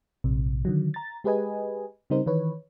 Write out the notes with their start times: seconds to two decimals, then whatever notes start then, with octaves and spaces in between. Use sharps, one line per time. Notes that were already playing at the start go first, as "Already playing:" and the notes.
0.24 A#1 G#2 C3
0.65 D3 D#3 F#3
0.94 A#5 A6
1.24 G#3 G4 G#4 B4 D#5 G#5
2.10 C#3 G3 C4 D#4 A#4 C5
2.26 D#3 E3 B4 C#5